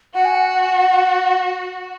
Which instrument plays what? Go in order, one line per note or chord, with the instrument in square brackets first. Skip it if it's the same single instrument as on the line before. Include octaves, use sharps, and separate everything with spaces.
[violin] F#4 [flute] F#5
[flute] G#5
F#5